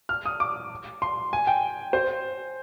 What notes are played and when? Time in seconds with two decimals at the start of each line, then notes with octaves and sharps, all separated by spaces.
0.09 F6
0.26 D#6
0.40 D6
1.02 C6
1.33 G#5
1.47 G5
1.93 C5